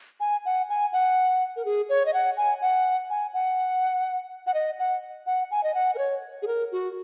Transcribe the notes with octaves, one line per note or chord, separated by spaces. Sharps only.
G#5
F#5
G#5
F#5
A#4
G#4
C#5
D#5
F#5
G#5
F#5
G#5
F#5
F#5
D#5
F#5
F#5
G#5
D#5
F#5
A#4
C#5
G#4
A#4
F#4